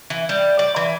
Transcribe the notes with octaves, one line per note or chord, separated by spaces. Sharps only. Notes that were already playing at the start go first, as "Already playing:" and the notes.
E3
G3
D5
E3